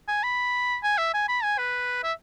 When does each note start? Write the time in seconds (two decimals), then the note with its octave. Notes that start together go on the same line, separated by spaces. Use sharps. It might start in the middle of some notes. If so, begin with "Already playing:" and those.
0.08 G#5
0.23 B5
0.83 G#5
0.98 E5
1.14 G#5
1.29 B5
1.43 G#5
1.59 B4
2.03 E5